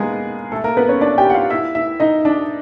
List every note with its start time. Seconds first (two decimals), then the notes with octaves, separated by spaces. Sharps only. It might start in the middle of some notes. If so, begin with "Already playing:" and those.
Already playing: G#3 A#3 B3 G#4 A#4
0.52 A3 A4
0.64 A#3 A#4
0.77 B3 B4
0.89 C#4 C#5
1.01 D4 D5
1.18 G4 G5
1.30 F#5
1.34 F4 F5
1.50 E4 E5
1.75 E4 E5
2.00 D#4 D#5
2.25 D4 D5